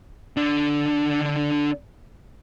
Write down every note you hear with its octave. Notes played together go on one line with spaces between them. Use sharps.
D3 D4